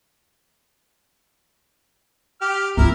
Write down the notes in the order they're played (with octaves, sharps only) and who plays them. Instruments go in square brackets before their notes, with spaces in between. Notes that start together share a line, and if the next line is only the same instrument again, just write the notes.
[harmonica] G4 F6
[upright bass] C4 F4 [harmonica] E4 A#4